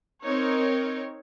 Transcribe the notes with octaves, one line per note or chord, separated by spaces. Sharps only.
C4 D#4 A#4 C#5